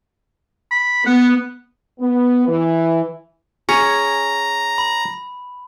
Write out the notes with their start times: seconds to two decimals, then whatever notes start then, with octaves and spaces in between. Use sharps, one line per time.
0.71 B5
1.06 B3 F#5
2.00 B3
2.47 E3
3.69 C#4 G#4 C#5 A#5
4.78 B5